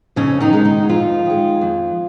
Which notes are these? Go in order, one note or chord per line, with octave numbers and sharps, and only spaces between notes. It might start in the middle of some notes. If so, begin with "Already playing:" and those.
F2 C#3 C#4
D#3 D#4
D#3 G#3
D#3 D#4
F#4
F2 F3 F4
D#3 G#3
F2